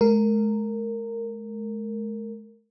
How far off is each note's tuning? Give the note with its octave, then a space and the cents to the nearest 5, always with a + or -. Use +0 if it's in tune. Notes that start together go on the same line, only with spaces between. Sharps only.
G#3 +45 A#4 -15